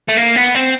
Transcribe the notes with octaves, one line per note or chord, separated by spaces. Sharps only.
A3
A#3
B3
C4